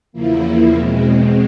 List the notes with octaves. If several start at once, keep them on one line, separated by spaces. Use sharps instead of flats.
E2 C#3 F3 A#3 E4
E2 B2 G#3 C4